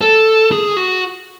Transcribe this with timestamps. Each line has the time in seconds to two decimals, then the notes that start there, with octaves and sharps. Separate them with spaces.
0.01 A4
0.52 G#4
0.77 F#4